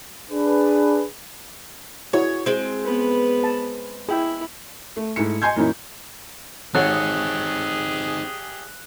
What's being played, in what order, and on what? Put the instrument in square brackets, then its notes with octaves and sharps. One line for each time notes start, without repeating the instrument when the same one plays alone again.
[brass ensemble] D4 G#4 B4
[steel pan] E4 F#4 G#4 [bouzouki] C#5
[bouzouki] G#3 C4
[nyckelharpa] B3 B4
[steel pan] A5
[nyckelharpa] E4 [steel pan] G#4 G5
[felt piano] A3
G#2 A3 E4 C#7
D#5 G#5 C6 G6 G#6
F#2 A#2 E3 C#4 D#4 E4
[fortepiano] G#1 C#5 F#5 [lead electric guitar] C4 D#4 [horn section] G4 G#4 [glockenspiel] F#6